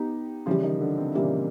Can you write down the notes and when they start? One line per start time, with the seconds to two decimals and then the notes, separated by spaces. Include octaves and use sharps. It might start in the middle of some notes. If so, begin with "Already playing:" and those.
Already playing: B3 D#4 G4
0.46 C#3 E3 F3 G3 F4
0.63 D#3 D#4
0.81 D3 D4
0.98 C3 C4
1.15 A#2 C#3 E3 G3 A#3